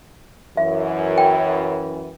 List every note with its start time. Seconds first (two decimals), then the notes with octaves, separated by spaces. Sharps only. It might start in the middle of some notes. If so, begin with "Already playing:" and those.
0.57 F#2 E3 E5
1.18 G5